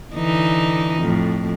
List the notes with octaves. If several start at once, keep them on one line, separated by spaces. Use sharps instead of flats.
D3 E3 D#4
F2 A2